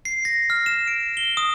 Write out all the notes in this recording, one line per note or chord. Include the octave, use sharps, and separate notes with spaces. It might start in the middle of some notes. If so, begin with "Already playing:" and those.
C7
A#6
F6
E7
D7
G7
D#6